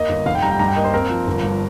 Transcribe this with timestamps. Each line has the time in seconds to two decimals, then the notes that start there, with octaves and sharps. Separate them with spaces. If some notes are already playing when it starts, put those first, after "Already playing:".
Already playing: A#3 D#5
0.09 G1
0.26 F1 F5
0.35 G5
0.42 G3 A#5
0.51 G5
0.59 G2 A#5
0.68 G5
0.76 A#3 D#5
0.84 C5
0.93 C4 A#4
1.10 F3
1.27 G1
1.43 G2